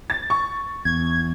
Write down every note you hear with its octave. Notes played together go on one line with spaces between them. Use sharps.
A6
C#6
E2 G#6